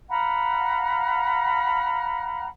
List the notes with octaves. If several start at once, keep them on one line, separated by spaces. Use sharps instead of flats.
F5 F#5 A#5 B5